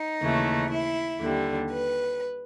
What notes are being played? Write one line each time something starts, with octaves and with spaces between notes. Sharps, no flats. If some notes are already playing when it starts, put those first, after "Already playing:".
Already playing: D#4
D#2 C#3 E3 A3
E4
D#2 D3 G3
B4